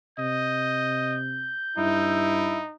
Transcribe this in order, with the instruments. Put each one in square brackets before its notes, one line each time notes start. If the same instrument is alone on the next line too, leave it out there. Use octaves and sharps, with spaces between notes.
[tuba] C3 [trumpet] D#5 [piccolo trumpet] G6
[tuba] G2 [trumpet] D#4 [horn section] E4